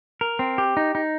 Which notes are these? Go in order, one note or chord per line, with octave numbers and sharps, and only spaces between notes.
A#4
C4
G4
D#4
D#4